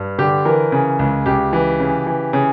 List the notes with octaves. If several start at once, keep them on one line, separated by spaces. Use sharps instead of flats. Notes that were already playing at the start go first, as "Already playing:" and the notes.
Already playing: G2
D3 G4
E3 A#4
C#3
C#2
C#2 G4
E3
C#3
E3
C#3